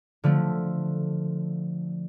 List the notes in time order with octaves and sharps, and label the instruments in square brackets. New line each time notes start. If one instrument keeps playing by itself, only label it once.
[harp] D3 F3 A3